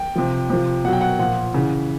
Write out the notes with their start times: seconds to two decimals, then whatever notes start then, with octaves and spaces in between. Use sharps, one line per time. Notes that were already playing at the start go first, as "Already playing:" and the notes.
Already playing: G5
0.16 C3 F3
0.50 C3 F3
0.84 B2 F#5
0.88 F#3 G5
1.01 F#5
1.19 A#2 F3 F#5
1.54 C#3 E3